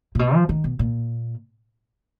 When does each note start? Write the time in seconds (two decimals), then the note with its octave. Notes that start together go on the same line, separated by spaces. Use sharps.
0.15 A#2
0.19 B2
0.34 F3
0.49 D#3
0.64 B2
0.79 A#2